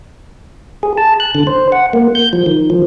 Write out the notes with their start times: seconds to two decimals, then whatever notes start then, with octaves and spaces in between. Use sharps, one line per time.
0.83 G#4
0.98 A5
1.20 F#6
1.35 D3
1.47 C5
1.72 F#5
1.93 A#3
2.15 G6
2.33 F3
2.46 D#3
2.70 F3